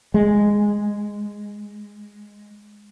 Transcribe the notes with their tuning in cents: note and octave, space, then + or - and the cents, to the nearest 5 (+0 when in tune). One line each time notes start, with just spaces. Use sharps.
G#3 -5